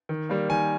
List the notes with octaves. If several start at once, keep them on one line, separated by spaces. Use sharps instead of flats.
D#3
G3 A#3
D#3 G#5